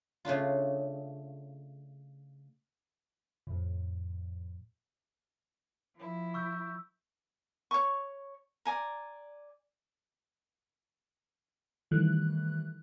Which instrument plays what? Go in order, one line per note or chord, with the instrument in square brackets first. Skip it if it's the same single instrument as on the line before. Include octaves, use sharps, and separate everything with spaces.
[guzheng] C#3 A3 D4 F4
[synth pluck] F2 A2
[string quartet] F3 E4
[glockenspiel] C#6 E6 G6
[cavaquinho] C#5 C#6
D5 G#5 A#5
[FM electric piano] D#3 E3 G3 A3 F#6